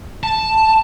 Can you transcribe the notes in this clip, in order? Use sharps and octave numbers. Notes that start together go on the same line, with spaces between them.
A5